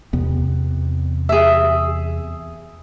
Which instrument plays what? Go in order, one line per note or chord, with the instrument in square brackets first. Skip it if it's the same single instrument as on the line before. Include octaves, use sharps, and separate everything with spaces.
[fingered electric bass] E2 C3 B3
[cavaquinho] G#4 E5